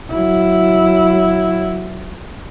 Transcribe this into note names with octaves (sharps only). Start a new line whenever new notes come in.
F#3 E4